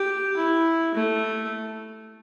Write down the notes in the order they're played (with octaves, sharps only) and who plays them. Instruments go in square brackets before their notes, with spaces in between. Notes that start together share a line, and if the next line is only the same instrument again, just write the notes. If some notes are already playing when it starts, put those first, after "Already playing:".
Already playing: [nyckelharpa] G4
E4
A3